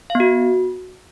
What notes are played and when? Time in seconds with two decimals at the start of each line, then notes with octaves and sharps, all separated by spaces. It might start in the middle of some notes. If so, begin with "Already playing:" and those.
0.10 F5
0.15 B3
0.20 F#4